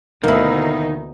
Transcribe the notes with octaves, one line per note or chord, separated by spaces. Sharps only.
D2 B2 D#3 A#3 D#4 E4